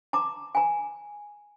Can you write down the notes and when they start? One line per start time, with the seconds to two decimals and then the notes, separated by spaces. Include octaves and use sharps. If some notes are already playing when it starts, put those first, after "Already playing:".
0.13 A5 A#5 D6
0.55 G#5 A#5